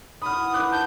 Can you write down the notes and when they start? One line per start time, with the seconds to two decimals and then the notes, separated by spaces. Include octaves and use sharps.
0.22 E4 F#4 B5 D#6 F6
0.41 B3 E4 A5
0.54 F3 D#4 B5 D6 F#6
0.72 A5 G6